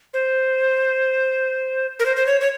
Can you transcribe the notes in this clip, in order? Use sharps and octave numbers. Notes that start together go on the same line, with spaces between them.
C5
A#4
C5
C5
C#5
C#5